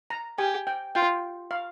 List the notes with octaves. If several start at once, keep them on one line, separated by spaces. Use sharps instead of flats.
A#5
G4 G#5
G5
F4 G5
F5